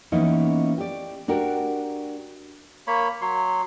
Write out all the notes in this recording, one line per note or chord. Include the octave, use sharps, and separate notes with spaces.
E3 A#3 B3 C#4 D#4
G4 D5
D4 F#4 G4 A#4
A#3 C#5 B5
F#3 C#5 C6